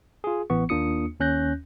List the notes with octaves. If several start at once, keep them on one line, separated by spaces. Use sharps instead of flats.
F4 G#4
A1 E3 B3 C#6
D#2 A#3 D4 F4 D#6 C#7
D#2 C#4 F#6 G6 A#6